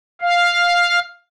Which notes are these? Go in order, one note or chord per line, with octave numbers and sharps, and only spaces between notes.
F5